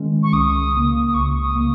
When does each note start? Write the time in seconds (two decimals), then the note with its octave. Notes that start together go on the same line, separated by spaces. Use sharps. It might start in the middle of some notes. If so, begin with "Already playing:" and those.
Already playing: D#3 G#3 C#4
0.23 C#6
0.33 C#2 D#6
0.74 C#3 A#3
1.06 D#6
1.14 C#2 C#6
1.41 D#6
1.55 C#3 A#3